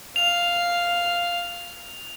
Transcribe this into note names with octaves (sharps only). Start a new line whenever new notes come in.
F5 F7